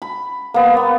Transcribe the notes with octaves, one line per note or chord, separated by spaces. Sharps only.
B5
A#3 B3
A#3 B3